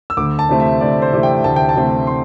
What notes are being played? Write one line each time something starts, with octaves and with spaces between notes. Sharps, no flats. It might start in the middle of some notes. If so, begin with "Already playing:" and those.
E6
D2 D6
A5
C3 E3 A3 C4
E5
D2 D5
C5
C3 E3 A3 C4
G5
D2 A5
G5
A5
C3 E3 A3 C4
C6